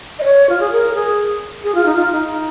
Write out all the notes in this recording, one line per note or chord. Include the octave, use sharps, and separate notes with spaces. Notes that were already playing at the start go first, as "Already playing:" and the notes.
D#5
C#5
F4
G#4
A#4
G#4
G#4
F4
D#4
F4
D#4